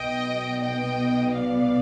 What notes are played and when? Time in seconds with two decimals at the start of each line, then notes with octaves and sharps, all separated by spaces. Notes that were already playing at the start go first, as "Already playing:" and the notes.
Already playing: B1 B2 B3 D#5 G5
0.62 D#5 G5
1.33 D5 F5